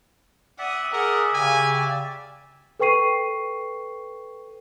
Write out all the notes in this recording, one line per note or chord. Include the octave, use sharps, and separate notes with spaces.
D5 E5 F#5 D#6
G#4 A#4 F#5
C#3 G4 G#5
A4 B4 G5 C#6 C7 D#7